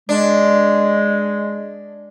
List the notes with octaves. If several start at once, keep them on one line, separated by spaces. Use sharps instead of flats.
G#3 D4